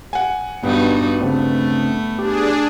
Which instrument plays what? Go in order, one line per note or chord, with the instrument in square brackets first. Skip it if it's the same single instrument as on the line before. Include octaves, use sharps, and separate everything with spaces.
[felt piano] F#5 G#5
[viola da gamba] G2 D#4 F#4 [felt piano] B3
[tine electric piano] C#3 C4 D4 [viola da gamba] A3
[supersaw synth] D4 G#4 [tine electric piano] G4